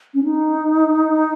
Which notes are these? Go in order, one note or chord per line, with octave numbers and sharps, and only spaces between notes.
C#4
D#4